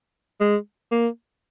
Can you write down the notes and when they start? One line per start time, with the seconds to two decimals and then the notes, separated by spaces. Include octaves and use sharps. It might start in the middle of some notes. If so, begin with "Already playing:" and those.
0.40 G#3
0.91 A#3